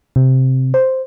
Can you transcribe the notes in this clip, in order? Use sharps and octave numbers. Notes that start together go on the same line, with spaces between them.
C3
C5